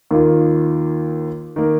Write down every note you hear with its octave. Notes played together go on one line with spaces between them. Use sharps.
D#2 D#3 A#3 F4
D#3 A#3